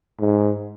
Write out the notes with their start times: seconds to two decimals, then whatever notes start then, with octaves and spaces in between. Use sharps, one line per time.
0.20 G#2